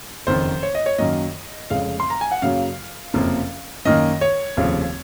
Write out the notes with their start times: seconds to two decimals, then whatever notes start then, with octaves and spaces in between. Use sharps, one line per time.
0.27 F#1 F2 D#3 C5
0.63 C#5
0.75 D#5
0.86 C#5
0.98 F#2 D#3 F#3 A#3 D#5
1.70 F1 F2 C#3 G#3 F5
2.00 C6
2.10 A#5
2.21 G#5
2.31 F#5
2.42 F#2 C#3 F#3 A#3 F5
3.14 F#1 F2 C3 F3 A#3
3.85 F#2 D#3 A#3 D#5
4.21 C#5
4.57 F1 D#2 C#3 F3